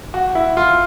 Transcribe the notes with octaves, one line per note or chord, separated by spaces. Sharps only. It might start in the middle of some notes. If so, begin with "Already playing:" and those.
F#4
E4
F4